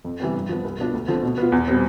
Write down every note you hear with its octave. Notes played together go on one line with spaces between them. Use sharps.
F2
C3 E3 G3 B3
G2
F3 B3
C2
B2 B3 D4 F4
D2
D3 F3 A3 C4
B2
B3 F4
E2
B2 G3 C4